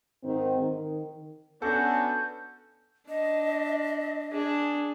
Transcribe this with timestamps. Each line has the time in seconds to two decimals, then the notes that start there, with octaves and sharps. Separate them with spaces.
0.23 G#2 D#3 C4
0.59 D#3
1.62 B3 C#4 D4 F#4 A4 G6
3.08 D4 D#5
4.32 D4 G#4